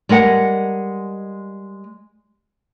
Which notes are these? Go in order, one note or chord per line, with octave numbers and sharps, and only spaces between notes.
G3 G#3 A#4 F#5